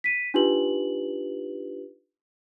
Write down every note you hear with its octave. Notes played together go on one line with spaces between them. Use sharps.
B6 D#7
D4 D#4 F4 G4 B4 F#7